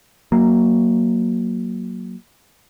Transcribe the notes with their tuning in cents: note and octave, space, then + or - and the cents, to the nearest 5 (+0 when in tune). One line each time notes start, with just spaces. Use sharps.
F#3 +0 A#3 +0